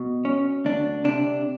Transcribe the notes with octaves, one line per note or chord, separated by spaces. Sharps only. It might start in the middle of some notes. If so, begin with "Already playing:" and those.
Already playing: B2
C#4
D2 D4
C3 D4